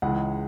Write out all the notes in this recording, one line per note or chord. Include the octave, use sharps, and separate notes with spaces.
C#2 C#3 E3 G#3 F#5